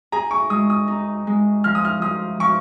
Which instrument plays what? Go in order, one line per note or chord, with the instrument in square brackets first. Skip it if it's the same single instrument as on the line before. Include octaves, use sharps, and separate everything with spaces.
[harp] G#4 [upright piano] A#5
[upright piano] C#6
[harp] G#3 [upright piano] D#6
[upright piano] D#6
[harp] D#4
G#3
[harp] F3 [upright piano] F6
[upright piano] D#6
F6
[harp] F3 [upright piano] D#6
[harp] F3 [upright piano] C#6